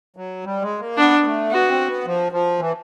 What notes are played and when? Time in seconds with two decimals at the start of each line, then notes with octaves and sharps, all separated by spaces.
0.17 F#3
0.45 G3
0.62 G#3
0.80 A#3
0.97 B3 D4
1.24 A3
1.51 B3 F#4
1.69 C4
1.87 B3
2.06 F3
2.32 F3
2.59 E3